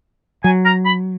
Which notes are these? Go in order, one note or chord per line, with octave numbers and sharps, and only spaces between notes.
F#3 G#5
A#5
B5